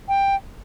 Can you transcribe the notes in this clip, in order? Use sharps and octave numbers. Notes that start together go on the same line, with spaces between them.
G5